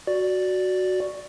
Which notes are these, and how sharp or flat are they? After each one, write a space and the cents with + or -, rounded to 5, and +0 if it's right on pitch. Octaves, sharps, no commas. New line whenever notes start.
F#4 +0 D5 +0